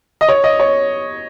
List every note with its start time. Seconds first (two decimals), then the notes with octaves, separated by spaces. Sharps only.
0.21 D#5
0.28 C#5
0.44 D#5
0.60 C#5